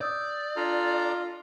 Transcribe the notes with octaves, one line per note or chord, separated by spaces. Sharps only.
D5 D#6 E6 G6
D4 F4 A4 A#5